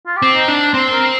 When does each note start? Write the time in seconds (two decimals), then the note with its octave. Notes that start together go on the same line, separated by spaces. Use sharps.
0.06 F4
0.16 G4
0.22 C4
0.35 D#4
0.48 D4
0.73 C4 C5
0.92 A#4